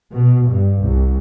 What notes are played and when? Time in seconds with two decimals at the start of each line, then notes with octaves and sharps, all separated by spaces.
0.13 B2
0.49 G2
0.83 C2